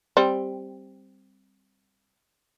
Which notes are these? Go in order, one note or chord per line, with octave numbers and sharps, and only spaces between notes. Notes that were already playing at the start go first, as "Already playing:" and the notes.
G3 C4